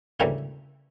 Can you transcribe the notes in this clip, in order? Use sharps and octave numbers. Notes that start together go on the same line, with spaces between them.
D2 C#3 E3 G3 A#3 E4